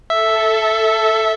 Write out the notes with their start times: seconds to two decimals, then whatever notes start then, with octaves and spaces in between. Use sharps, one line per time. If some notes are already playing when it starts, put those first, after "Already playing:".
0.10 A4 E5